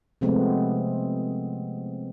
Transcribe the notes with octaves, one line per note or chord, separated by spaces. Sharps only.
C3 F3 G#3 A3 B3 C4